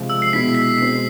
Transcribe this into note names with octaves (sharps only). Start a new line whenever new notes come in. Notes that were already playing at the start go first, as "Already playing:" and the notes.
Already playing: C3 F3 G#3
E6
C7
B2 G#3 B3 E4 B6
B6
B2 G#3 C4 C7